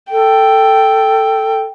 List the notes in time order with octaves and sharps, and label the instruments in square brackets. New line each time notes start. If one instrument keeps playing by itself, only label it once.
[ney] A4 [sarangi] G5